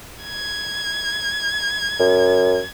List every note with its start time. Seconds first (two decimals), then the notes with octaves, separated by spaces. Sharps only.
0.24 G#6
1.99 F#2